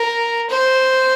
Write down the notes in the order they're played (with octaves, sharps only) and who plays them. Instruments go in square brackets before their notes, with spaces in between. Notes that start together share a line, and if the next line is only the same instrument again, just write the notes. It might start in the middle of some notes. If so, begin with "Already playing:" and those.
Already playing: [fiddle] A#4
C5